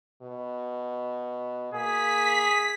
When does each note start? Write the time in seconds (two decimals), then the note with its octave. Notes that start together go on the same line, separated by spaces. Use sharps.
0.22 B2
1.74 A#3 G#4 B6